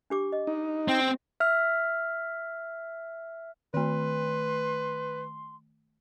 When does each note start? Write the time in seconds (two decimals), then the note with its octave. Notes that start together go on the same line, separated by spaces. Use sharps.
0.10 D4 G4 D6
0.32 D#5
0.47 D#4
0.88 C4 G5
1.40 E5 F6
3.74 D#3 A3 B4 C6